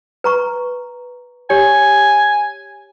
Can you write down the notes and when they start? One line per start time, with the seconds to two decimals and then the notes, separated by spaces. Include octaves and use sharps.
0.24 B4 A#5 C#6
1.50 G4 C#5 G#5